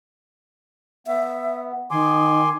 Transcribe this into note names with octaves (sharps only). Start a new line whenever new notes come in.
B3 E5
D#3 G#5 C6 D6